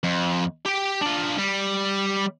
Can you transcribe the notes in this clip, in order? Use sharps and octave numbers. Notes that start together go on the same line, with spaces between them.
F2
G4 G5
D4 F4
G3